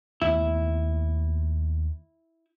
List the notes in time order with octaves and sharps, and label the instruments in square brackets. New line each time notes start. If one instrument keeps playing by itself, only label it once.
[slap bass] D#2 A3 B3 [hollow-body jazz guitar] E4